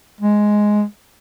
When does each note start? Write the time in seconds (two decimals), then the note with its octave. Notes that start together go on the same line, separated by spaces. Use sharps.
0.21 G#3